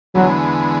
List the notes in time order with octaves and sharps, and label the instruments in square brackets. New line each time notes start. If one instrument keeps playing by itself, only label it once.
[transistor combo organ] E2 D3 G#3 B3 [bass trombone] F#3